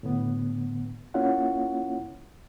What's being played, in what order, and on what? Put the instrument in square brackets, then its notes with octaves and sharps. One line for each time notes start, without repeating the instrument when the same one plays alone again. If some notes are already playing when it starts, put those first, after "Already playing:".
[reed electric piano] A2 D3 B3
A#3 C#4 E4 F4 C#5 F#5